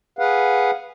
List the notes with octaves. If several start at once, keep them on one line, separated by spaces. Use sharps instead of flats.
G#4 B4 F5 F#5